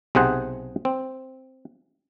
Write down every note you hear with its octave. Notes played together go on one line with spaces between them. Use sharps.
B1 C3 G#4 C5 F#5
C4